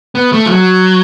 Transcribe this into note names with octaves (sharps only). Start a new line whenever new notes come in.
B3
A3
F3
F#3